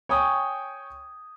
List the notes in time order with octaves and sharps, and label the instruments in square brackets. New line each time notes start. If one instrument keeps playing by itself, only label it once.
[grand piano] C#5 G5 G#5 C#6 D#6